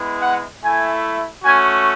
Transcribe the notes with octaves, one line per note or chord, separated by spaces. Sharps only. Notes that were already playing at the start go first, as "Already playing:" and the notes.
Already playing: G#3 B3 E4
F#5
A3 E4 G#5
A3 C#4 F#4 G#5